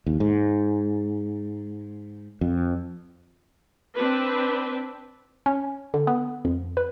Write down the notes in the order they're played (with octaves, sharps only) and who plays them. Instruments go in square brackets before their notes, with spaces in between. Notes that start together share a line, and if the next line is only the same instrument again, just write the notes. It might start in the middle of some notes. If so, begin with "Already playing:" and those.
[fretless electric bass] D#2
G#2
F2
[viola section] C4 D4 B4
[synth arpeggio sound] C#4
D3
B3
F2
B4